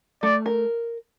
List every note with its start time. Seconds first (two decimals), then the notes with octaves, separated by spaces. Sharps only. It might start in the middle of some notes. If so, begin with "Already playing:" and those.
0.23 A3 D5
0.46 A#4